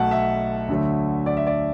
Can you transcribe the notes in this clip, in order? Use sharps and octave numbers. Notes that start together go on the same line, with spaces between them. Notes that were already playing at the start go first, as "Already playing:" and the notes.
Already playing: B1 B2 A3 F#5 A5
E5
D2 D3 F#3 A3
D5
E5
D5